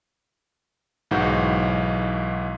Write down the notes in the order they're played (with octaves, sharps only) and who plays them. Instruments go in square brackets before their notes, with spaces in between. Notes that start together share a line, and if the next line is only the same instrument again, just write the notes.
[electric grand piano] B1 G#2 E3 F#3 F#4 G6